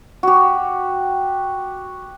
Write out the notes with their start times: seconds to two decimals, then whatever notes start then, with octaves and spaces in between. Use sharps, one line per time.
0.23 F#4 G4